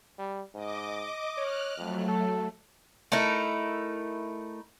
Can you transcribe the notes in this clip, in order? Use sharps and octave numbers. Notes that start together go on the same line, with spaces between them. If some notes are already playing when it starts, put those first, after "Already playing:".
G3
G#2 D#5 D6
C#5 F6 F#6
F2 F#3 A3
A4
A3 D#4 E4 A#4